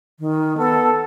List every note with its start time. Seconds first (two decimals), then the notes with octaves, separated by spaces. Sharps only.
0.20 D#3
0.58 B3 A4